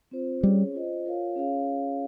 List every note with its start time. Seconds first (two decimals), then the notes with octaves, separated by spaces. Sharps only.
0.11 C4 F4 C5
0.42 G3 C#4 G#4 C#5
0.74 F4 C5 D#5
1.05 F4 A#4 C#5 F5
1.36 C#4 G#4 C#5 F5